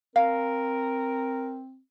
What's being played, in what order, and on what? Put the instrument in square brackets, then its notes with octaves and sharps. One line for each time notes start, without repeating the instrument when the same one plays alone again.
[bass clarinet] C4 [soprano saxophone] A#4 [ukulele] F5